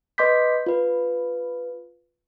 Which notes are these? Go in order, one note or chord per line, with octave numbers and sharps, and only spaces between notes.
B4 D#5 C6 D6 G6 B6
F4 B4